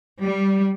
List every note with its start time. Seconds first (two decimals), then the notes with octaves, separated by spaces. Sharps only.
0.23 G3